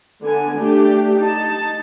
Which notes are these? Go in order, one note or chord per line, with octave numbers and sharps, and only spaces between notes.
D3 B3 G#5
A3 D4 G4
D#4 A5